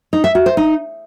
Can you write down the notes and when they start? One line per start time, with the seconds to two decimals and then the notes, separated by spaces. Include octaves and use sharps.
0.13 D#4
0.24 E5
0.35 F#4
0.46 C5
0.57 D#4